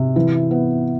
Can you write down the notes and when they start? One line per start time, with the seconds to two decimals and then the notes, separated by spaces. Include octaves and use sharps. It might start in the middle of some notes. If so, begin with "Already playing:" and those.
Already playing: C3
0.16 E3
0.51 B3